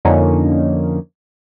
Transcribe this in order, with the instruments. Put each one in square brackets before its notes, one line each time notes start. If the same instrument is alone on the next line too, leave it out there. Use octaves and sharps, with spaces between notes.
[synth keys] F2 D3 F3 A#3 C#4 D#4